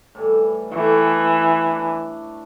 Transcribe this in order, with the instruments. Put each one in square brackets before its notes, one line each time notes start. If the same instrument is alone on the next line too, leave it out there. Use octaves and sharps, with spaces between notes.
[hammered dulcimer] A2 E3 G3
[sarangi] E3 [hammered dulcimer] A3 G5
[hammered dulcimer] D4